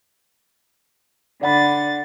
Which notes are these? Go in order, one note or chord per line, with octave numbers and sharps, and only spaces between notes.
D3 D5 F#5 B5 A6